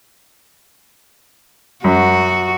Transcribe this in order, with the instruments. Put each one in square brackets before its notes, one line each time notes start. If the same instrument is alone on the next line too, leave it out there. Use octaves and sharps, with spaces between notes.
[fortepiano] F#2 [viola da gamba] F#4